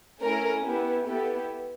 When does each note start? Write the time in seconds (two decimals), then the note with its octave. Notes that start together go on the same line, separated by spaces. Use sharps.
0.21 A3 C#4 E4 A#4
0.63 B3 E4 G4
1.06 B3 E4 G4 A4